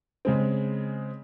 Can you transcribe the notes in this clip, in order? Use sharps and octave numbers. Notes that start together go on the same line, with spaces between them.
C#3 G#3 C4